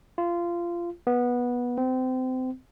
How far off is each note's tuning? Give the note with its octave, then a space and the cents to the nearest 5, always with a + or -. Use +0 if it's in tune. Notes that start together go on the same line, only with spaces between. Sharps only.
F4 -20
B3 -15
C4 -30